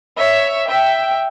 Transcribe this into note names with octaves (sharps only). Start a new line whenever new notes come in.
C#5 E5
E5 G5